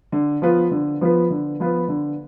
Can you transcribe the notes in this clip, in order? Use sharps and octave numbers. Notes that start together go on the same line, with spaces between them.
D3
F3 B3 F4 B4
D3
F3 B3 F4 B4
D3
F3 B3 F4 B4
D3